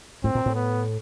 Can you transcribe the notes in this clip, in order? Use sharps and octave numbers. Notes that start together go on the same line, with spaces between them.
A2 C4
A#2
A2
B3